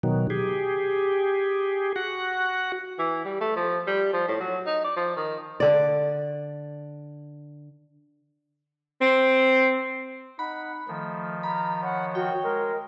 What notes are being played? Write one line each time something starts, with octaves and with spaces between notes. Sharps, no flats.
B2 D#3 F#3
G4 G#4
F#4 F#5
E3
G3
A3
F3
G3
F3
A2
F#3
D#4
D5
F3
D#3
D3 D5
C4
D#4 F#5 B5
D#3 F3 A3
A#5 B5
C#5 F#5
F#4 G5
G#3 A#4